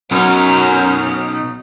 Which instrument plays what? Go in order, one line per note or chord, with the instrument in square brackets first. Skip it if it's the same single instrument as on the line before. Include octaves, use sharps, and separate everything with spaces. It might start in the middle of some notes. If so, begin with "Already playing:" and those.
[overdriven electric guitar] B1 D#4 [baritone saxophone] F#2 [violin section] C#4 F#4 F6